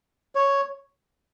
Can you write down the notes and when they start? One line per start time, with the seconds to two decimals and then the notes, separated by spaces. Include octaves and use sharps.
0.35 C#5